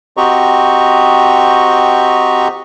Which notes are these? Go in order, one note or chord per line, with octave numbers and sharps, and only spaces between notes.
C4 F#4 G4 D#5 A#5 C#6